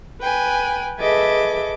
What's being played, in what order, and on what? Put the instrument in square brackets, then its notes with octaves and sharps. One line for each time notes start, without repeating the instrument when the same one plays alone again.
[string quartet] B4 G5 G#5
G#4 A4 B4 D#5 E5 D6